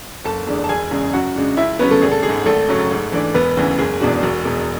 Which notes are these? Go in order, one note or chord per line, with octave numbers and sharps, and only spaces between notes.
F#1 A4 A5
E2 D3 G#3 D4
A5
E1 G#4 G#5
E2 C#3 G#3
F#2 F#4 F#5
C#3 G#3 D4
C#2 E4 E5
C#3 F#3 B3 C#4 B4
A3 A4
G#1 G#4
A4
G#3 G#4
G#2
G#1 A3 A4
F#2 C#3 F#3 C#4
G#2
E3 A3 D4
E1 B3 B4
D2 C#3 E3
F#1 G#4
E2 B2 G#3 D4 F#4
E1 F#4
E2 B2 G#3